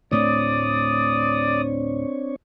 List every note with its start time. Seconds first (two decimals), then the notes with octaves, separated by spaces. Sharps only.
0.11 D2 A2 A3 C4 D4 C#5 D5 D#6